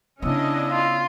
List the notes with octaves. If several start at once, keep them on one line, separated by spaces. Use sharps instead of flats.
C#3 B3 C#4 D4 E4 D#5 F5 E6
F4